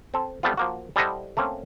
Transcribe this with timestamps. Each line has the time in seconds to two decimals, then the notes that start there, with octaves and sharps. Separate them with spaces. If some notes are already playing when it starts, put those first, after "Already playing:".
0.14 C4 A4
0.43 G3 A3 B3 C4 F4
0.57 F3 A#3 F#4
0.96 G3 E4 A4 C5 D#5 F#5
1.37 A3 A#3 C4 C#4